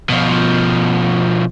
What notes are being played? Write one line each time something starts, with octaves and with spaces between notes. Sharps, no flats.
B2 F3